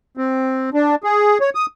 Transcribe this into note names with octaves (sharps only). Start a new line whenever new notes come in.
C4
D4
G#4
C#5
D#6